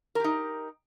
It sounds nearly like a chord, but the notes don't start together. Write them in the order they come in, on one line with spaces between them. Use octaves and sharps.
A#4 G4 D#4